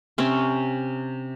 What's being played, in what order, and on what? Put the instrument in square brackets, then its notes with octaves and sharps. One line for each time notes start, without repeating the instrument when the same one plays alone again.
[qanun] C3 C4 C#4